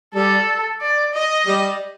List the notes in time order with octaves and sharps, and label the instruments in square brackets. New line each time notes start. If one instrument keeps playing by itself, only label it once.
[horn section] G3 [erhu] A4
[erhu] D5
D#5
[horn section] G3